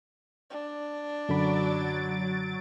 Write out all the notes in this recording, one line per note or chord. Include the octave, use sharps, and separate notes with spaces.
D4
F#2 D3 F#3 B5 A6 D7